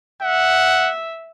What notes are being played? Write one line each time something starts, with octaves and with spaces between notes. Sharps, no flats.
E5 F#5